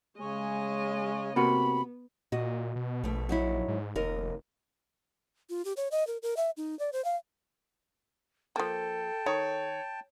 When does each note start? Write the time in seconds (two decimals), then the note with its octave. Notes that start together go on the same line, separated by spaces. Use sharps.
0.20 C#3 G#3 C#5 D#5 G#5
1.36 C3 A#3 B3 F#4 B5
2.32 A#2 F#4 D#5
2.76 B2
3.04 A#1 B2 A3
3.29 F#3 D#4 E4
3.68 G#2
3.95 F1 D#2 A#4 D#5
5.50 F4
5.65 G4
5.77 C#5
5.91 D#5
6.07 A#4
6.22 A#4
6.37 E5
6.57 D#4
6.79 D5
6.93 C5
7.04 F5
8.56 F3 A#3 A4 G5 A5
9.26 D#3 C#5